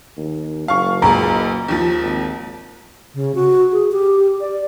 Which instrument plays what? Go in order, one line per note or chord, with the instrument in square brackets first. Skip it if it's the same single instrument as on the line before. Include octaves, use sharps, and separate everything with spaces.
[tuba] D#2
[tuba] F#1 [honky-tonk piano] F5 C#6
[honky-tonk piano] C#2 A#2 G#4 [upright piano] A#5
[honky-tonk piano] D#2 F3
[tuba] G#1
[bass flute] C#3
F#4
G#4
G4
D5